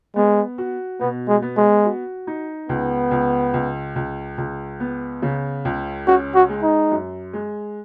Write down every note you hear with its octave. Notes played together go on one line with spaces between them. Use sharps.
G#3 B3
F#4
B2 B3
G#3
B3
G#3
F#4
D#4
C#2 B3
C#2
C#2
C#2
C#2
B3
C#3
C#2
C#4 F#4
F#4
G#3
D#4
F#2
G#3